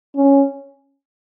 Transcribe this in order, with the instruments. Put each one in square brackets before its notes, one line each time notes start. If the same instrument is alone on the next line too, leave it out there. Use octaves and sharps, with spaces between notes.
[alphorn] C#4